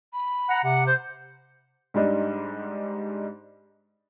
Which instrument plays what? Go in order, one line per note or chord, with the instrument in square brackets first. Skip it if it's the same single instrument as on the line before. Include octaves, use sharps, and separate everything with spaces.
[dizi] B5
[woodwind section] F#5 A#5
[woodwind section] C3 [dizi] F#5
[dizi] C5
[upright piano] G#2 G3 D4 D#4